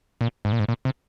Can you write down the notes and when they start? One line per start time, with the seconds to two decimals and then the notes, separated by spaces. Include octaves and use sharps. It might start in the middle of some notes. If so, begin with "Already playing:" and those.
0.21 A#2
0.45 G#2
0.52 A#2
0.60 G#2
0.69 A#2
0.85 C3